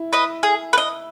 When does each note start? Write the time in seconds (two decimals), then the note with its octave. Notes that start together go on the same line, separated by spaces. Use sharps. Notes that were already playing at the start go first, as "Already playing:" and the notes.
Already playing: E4
0.13 B4 D#5
0.43 G#4
0.73 B4
0.78 D#5